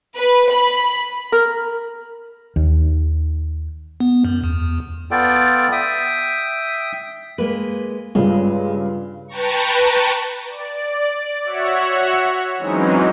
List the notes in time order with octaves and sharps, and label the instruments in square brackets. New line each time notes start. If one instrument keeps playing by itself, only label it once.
[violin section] B4
B5
[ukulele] A#4
[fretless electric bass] D#2
[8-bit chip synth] B3
F#2
E2
[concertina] B3 F4 A4 D5 G5
E5 G5 D#6
[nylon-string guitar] G#3 A#3 B4
[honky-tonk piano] G2 C#3 F4 [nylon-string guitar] G#3
[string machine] B4 G5 A5 A#5 C#6
[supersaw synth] D5
F#4 C#5 E5 F#5
E3 F#3 G#3 C4 C#4 D#4